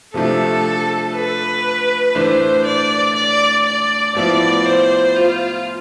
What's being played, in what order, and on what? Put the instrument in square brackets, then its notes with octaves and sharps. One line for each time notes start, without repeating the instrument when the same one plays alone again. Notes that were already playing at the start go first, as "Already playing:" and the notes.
[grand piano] C3 F3 A3 D4 [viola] A4
[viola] B4
[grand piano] A2 E3 A3 D4 [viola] C5
[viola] D5
D5
D5
[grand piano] A2 F3 B3 E4 [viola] D5
[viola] C5
F4